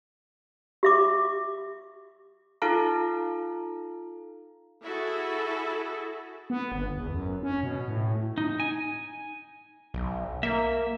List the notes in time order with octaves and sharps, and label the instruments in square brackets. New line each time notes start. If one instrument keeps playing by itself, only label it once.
[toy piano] G4 E5 D6
[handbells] D#4 F4 A4 F5 A5 A#5
[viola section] E4 F#4 G#4 A4
[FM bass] B3
G1
E2
F#2
C#4
B2
A2
[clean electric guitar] D#4
G#5
[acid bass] B1
[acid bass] A#3 [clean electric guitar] E5